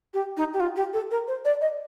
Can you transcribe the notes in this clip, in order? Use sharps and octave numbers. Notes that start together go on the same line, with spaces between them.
G4
D#4
G4
F4
G4
A4
A#4
C5
D5
D#5